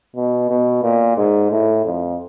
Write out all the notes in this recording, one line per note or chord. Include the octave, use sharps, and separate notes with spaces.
B2
B2
A#2
G#2
A2
F2